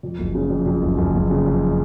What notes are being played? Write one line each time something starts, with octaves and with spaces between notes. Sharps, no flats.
F2
F#1
C#3
F2
F2
F#1
F#1
F#1
C#3
F2